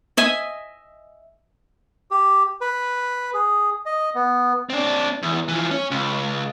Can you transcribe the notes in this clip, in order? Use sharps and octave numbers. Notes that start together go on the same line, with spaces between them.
D#5 E5 G#5
G4
B4
G#4
D#5
B3
C4 D4
E2
E3 F3
C#4
C#2